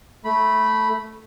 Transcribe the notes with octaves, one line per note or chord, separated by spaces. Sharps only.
A3 B5